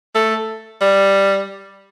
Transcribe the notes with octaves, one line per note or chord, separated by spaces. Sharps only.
A3
G3